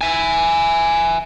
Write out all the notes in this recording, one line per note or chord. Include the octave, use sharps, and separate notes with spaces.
E5 G#5